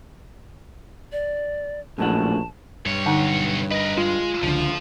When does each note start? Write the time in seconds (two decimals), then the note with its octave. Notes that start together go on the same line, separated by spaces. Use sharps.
1.12 D5
1.98 A#1 F#2 A2 F#5 A5
2.86 B1 G2 C#5
3.06 D3 D#4 F#5
3.71 A#4 B4 D#5
3.97 G#3 F4
4.43 C#2 D3 F3